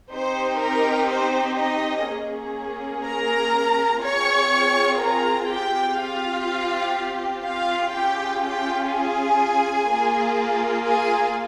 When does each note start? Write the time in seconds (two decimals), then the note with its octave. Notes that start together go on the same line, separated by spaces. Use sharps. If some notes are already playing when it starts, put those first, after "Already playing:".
0.13 C4 D#4 G4 C5
0.61 A#4
1.10 C5
1.59 D#4 D#5
2.08 A#3 C#4 G#4
3.05 A#4 A#5
4.03 C4 F4 G#4 C#5 C#6
5.00 A#4 A#5
5.49 G4 G5
5.99 C4 F4 G4 F5
7.44 F4 F5
7.93 C#4 F4 G4 G#4 G5
8.42 G4 G5
8.90 G#4 G#5
9.88 A#3 F4 G#4
10.85 G#4 G#5